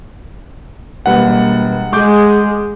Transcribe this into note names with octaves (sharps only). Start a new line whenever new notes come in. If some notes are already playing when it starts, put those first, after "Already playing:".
E1 G3 A#3 B4 F#5
G#3 G#4 D6 G6